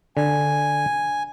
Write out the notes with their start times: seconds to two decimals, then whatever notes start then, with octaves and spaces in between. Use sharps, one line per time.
0.17 D3 G#5